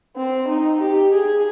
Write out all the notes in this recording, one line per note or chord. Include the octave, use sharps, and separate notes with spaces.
C4
D#4
G4
G#4